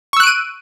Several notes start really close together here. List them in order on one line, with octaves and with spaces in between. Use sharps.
C#6 E6 F#6 D7 D#7